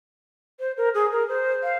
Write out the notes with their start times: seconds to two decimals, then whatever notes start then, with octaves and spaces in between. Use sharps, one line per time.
0.60 C5
0.77 A#4
0.94 G#4
1.12 A#4
1.29 C5
1.63 F5